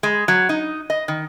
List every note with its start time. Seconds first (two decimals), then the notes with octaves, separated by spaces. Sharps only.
0.03 G#3
0.28 F#3
0.49 D#4
0.90 D#5
1.08 D#3